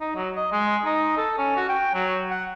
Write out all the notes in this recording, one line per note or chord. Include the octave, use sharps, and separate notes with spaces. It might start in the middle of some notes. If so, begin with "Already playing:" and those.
D#4
F#3
D#5
G#3
D#4
A4
C#4
F#4
G5
F#3
F#5